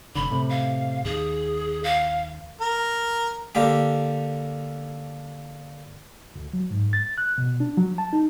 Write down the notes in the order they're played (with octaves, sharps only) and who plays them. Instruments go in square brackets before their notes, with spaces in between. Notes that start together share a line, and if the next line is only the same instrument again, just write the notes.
[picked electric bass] F1 D3 [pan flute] B5
[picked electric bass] A2 C3
[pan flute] F5
[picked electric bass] D#2 [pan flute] G#4
[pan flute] F5
[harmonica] A#4
[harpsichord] D3 A#3 G4
[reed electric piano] D2
F#3
G#2
A6
F#6
B2
D4
F#3
A5
D#4